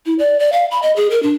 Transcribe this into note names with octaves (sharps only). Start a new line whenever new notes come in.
E4
D5
D5
F5
B5
D#5
G#4
A#4
D4